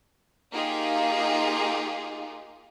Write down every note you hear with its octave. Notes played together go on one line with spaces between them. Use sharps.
A#3 D#4 F4 G4 G#4